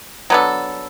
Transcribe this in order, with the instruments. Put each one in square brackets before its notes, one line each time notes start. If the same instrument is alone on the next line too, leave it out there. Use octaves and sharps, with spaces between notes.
[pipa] F#3 B3 D4 A4